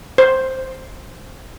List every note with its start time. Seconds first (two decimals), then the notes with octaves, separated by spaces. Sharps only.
0.18 C5